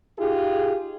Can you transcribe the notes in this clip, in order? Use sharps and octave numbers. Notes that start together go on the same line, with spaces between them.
D#4 F4 G4 G#4